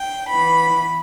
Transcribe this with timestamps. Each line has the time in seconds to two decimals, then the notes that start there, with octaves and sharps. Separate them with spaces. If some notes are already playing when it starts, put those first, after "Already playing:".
Already playing: G5
0.28 E3 B3 B5